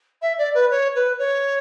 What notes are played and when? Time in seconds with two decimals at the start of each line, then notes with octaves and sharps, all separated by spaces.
0.22 E5
0.38 D5
0.54 B4
0.71 C#5
0.95 B4
1.19 C#5